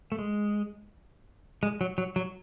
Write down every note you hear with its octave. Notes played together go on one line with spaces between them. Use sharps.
A3
G#3
G#3
F#3
F#3
F#3